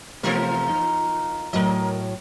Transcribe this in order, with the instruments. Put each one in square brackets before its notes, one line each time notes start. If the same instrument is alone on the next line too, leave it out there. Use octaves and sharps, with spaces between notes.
[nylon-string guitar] C3 A3 B3 [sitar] E3 F4 A#4
[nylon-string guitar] D#4
[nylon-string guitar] A2 F#3 [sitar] A#4 D#5